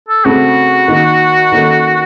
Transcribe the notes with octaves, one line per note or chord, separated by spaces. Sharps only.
A4
C#3 A3 C4 F#4
D#3 A#3 D#4
D#3 A#3 C#4 A4